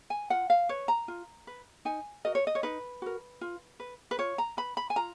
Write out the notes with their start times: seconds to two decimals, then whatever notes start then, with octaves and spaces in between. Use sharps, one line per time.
0.10 G#5
0.30 F4 F#5
0.50 F5
0.69 B4 C#5
0.88 A#5
1.08 F4
1.47 B4
1.85 D#4 G#5
2.25 F#4 A#4 D#5
2.35 C#5
2.47 D#5
2.55 C#5
2.63 D#4 B4
3.02 F#4 A#4
3.41 F4
3.80 B4
4.11 B4
4.19 F4 C#5
4.38 A#5
4.57 B4 B5
4.77 B5
4.90 G#5
4.96 F4 A#5